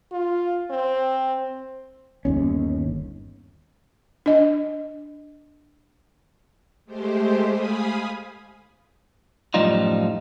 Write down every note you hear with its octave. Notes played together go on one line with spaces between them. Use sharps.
F4
C4
G1 D#2 C#4
D4 D#5
G#3 A3 G4 C5
F5 G#5 B5 D#6
F#2 A2 F3 G3 D#4 F4